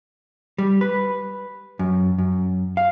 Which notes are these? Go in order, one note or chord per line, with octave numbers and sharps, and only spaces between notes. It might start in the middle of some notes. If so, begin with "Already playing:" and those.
G3
B4
F#2
F#2
F5